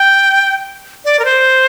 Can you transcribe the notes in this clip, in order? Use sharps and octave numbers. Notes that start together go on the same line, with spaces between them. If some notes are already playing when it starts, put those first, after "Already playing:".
Already playing: G5
D5
A#4
C5